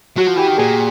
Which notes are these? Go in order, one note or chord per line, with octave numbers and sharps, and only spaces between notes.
F#3 F#4
F3
E3 G4
D#3
A#2 G#4